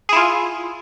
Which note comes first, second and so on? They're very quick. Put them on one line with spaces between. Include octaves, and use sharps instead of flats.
G#4 E4 F4